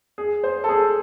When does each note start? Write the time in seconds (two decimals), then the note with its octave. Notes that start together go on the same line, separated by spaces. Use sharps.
0.18 G#4
0.43 C5
0.64 A4
0.69 G#4